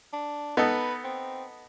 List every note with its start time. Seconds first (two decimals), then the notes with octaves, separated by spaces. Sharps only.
0.13 D4
0.57 B3 D#4 A4 B4
1.04 C4